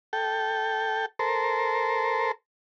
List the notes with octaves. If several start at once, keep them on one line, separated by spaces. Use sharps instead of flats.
A4 G5
A4 A#4 C5